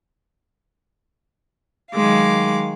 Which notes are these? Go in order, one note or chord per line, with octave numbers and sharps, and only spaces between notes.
D#3 F#3 G#3 F5 D6